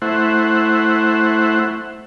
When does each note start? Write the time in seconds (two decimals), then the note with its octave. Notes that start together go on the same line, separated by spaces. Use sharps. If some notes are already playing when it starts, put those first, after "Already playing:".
0.02 A3 E4 C5 F#5